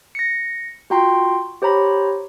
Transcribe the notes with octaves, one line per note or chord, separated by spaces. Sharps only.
A#6 C#7
F4 F#4 G5 A#5 C6
G4 C5 C#5 A#5 B5